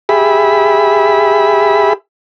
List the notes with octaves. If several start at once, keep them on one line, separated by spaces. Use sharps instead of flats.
G4 G#4 E5 B5